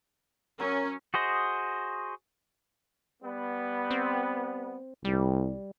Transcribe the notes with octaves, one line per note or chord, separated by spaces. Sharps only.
F#3 C#4 A#4
F#4 G#4 C5 D#5
G3 B3
C4
C2 G3